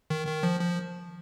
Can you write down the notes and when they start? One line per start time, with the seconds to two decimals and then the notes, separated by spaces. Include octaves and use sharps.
0.10 D#3
0.27 D#3
0.43 F3
0.60 F3